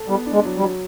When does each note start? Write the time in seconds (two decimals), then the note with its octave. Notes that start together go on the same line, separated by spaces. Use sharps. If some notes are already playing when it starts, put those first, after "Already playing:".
Already playing: A4
0.08 G3 B3
0.26 D4
0.33 G#3
0.45 F#3
0.57 G3
0.62 F#3